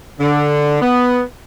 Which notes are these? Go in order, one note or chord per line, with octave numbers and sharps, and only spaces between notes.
D3
B3